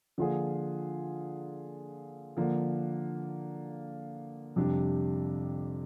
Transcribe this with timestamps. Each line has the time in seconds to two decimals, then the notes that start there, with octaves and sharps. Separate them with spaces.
0.18 D3 F3 A#3 F4 G#4
2.37 D3 F3 A#3
4.56 F2 C3 G3 D4 G4